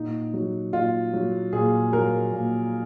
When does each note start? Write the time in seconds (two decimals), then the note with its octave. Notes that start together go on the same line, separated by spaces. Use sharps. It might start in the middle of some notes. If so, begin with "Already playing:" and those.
Already playing: A#2 D#4
0.34 F#3
0.73 A#2 F4
1.13 F#3
1.53 A#2 G#4
1.92 F#3 A#4
2.32 A#2